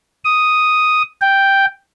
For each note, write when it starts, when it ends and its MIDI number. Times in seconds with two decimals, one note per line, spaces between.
0.24 1.02 87
1.21 1.65 79